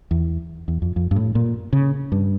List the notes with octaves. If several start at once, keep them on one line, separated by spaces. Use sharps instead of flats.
E2
E2
F2
F2
G2
A2
A#2
C#3
G2